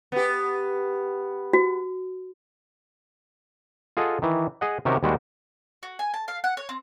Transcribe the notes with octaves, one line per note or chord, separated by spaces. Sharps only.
B3 G4
F#4
F4 G#4 A4 D#5 F#5
D#3 E3
G#4 D#5 F#5
C3 D#3 C#4 F#4 G4 A#4
D#2 G3 G#3 F#4 G5
F#4
G#5
A5
F5
F#5
C#5
C4